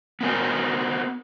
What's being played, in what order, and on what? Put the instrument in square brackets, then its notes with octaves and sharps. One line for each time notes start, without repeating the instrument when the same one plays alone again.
[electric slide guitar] B3 C4 F#4 A#4 G#5